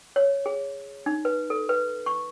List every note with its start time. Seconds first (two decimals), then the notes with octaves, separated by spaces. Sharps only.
0.16 C#5
0.46 G#4
1.06 D#4
1.25 B4
1.50 A4
1.69 B4
2.06 C#6